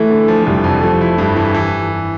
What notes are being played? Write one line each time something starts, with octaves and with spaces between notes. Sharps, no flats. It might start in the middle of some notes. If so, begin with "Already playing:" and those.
Already playing: E3 A3
D3
F3
F1 G3
F2
F3 A3
E4
G2 G3
E3
E3